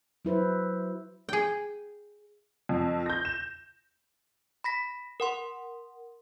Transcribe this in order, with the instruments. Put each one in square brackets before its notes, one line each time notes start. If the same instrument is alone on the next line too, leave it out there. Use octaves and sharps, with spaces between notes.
[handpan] F#3 E4 B4 C5
[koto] G#4 G5
[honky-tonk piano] F2
G6 A#6
E7
[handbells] B5 A#6 B6
A#4 F#5 C6